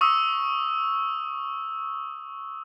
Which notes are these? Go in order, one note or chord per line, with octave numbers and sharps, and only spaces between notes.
C#6 D#6 E6